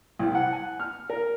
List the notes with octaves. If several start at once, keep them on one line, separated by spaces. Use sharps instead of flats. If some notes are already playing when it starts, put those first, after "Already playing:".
C2
F#5
G#5
F6
A#4